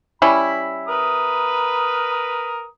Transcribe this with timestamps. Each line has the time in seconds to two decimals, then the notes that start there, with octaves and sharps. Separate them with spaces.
0.22 G3 C#4 E4 B5
0.88 A#4 B4 D#6